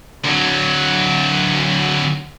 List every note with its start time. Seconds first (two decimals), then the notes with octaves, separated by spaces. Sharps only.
0.24 D2 F#3